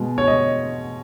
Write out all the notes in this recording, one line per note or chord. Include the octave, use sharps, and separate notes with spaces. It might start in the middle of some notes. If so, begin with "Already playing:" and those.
Already playing: B2 G#3
C#5
D#5